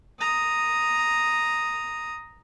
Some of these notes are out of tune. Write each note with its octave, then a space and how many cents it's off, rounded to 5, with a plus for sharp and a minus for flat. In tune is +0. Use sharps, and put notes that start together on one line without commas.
A#5 +0 D#6 +0